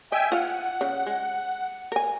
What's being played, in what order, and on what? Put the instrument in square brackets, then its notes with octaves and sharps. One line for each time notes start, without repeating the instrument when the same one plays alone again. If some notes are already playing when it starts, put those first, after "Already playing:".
[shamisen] D#5 [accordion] E5 G5 G#5
[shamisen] F4 F5 [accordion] F#5
[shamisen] C#3
G#3
A#4 G#5